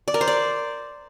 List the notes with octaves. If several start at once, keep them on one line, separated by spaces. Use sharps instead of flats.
D5
A#4
C5
D5